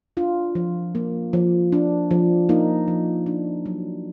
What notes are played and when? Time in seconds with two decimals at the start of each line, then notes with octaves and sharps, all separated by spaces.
0.17 D4 F4
0.55 F3
0.95 A#3
1.33 F3
1.72 D4
2.11 F3
2.49 A#3 D#4
2.88 F3
3.26 D4
3.66 F#3